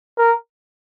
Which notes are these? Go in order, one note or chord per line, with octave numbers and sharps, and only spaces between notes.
A#4